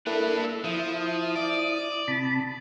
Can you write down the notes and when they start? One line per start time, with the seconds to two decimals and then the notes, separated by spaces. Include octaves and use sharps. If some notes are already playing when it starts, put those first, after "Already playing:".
0.07 A#3 D4 E4 A4 B4
0.44 E5
0.64 F3 E4 D#6
1.36 D5
2.08 C3 A5 B5